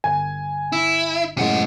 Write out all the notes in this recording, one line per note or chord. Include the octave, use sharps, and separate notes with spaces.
G1 G#5
E4
F#2 A2 C3 G#3 F#5